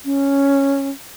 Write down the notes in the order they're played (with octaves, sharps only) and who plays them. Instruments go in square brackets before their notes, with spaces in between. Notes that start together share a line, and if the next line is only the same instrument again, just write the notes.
[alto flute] C#4